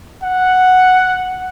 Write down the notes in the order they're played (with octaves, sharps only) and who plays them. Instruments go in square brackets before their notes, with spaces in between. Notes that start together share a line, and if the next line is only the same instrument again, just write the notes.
[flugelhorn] F#5